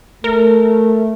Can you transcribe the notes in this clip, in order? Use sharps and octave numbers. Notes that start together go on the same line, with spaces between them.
A3 A#4